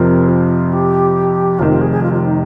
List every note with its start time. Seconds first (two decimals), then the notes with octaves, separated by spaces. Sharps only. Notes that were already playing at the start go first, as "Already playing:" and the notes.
Already playing: F2 C3 F3 C4 A#4
0.28 F4
0.72 G4
1.58 F1 F2 C3 D#3 F4
1.70 F4
1.81 G#4
1.91 G#4
2.02 F4
2.13 F4
2.24 D#4